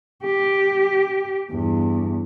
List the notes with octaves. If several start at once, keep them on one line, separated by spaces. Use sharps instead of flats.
G4
E2 G2